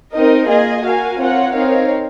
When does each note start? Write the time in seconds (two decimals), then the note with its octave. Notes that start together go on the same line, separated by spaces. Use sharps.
0.13 C4 D#4 A#4 D#5
0.48 A#3 F4 G#4 D#5 G#5
0.84 F#4 A#4 F5 G#5
1.19 C4 F4 A#4 C#5 F#5
1.55 C4 D#4 A#4 C#5 F5